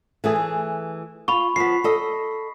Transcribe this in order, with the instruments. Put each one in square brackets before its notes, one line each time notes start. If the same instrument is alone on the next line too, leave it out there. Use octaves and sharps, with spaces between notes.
[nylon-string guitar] E3 A3 G#4
[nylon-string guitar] F4 [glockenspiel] B5 C#6
[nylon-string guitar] F3 B3 [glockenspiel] B6 C7
[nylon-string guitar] A4 D#5